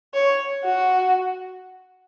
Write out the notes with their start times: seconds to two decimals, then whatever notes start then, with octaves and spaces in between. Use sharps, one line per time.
0.14 C#5
0.65 F#4